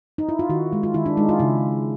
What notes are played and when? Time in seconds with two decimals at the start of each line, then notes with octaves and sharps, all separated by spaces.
0.18 D#4
0.29 E4
0.39 F4
0.49 D#3 F#4
0.73 G#3
0.83 F4
0.94 D#3 E4
1.06 D4
1.17 G#3 D#4
1.29 F4
1.39 C#3 E4